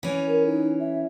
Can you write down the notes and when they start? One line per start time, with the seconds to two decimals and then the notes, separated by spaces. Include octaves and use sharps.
0.03 E3 C#4
0.28 A#4
0.46 D#4
0.80 E5